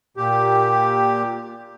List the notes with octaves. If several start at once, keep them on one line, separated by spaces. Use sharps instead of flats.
A#2 G4